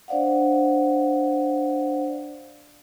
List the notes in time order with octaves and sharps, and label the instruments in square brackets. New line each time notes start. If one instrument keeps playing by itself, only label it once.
[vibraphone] D4 C5 D5 F5 F#5